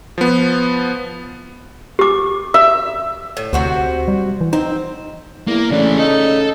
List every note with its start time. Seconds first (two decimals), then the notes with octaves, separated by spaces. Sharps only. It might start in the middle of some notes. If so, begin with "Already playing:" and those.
0.18 F3 B3
1.99 G4 D6
2.54 E5
3.37 A2
3.53 D2 C3 F#4 C5
4.08 G3
4.41 E3
4.53 C4 D#4
5.47 E2 A#3
5.71 C#3 E3 A3 D4
5.98 D#4 A4